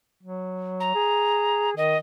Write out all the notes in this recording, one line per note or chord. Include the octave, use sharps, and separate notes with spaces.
F#3
A#5
G#4
D#3 D#5